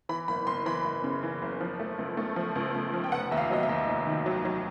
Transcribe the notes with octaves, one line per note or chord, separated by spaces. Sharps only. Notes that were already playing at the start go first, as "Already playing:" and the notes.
E3 B5
F#1 B5
F#1 C6
E3 B5
F#1
C#3
E3
F#1
F3
A3
C#2
A3
F3
C#2
C#2
F3
G5
F1 F#5
D#2 E5
F5
F#3 D#5
E5
D#2
F1
D#3
F#3
F#3